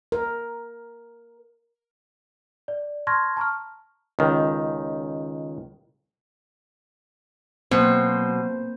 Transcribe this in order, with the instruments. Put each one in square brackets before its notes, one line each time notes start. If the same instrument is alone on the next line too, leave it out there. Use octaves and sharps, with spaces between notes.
[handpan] A#4
[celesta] D5
A5 C6 C#6 F6 G#6 A#6
A5 A#5 C#6 F6
[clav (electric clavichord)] C#2 D#3
[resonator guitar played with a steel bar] B2 [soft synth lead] F#3 [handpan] A#3 C4 C5